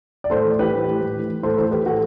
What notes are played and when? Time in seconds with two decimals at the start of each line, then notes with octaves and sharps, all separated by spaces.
0.24 D5
0.30 A2 A4 C5
0.44 E3
0.59 E3 G4 B4
0.72 A2
0.87 E3
1.02 A2
1.15 E3
1.29 E3
1.43 A2 A4 C5
1.58 E3 A4 C5
1.71 E3 G4 B4
1.86 A2 F#4 A4